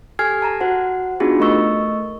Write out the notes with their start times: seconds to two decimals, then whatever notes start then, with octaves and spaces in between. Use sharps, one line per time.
0.19 G4 A4 G#5 F6 G#6 C7
0.42 A5 A#5 G#6
0.60 F#4 C5 F#5
1.20 B3 D4 D#4 F4 F#4 G#4
1.40 A3 A#4 D#5 C#6 E6